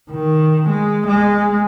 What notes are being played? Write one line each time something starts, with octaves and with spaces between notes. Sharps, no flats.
D#3
G#3
G#3